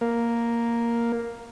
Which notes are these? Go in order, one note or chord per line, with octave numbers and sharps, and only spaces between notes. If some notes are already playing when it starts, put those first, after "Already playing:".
A#3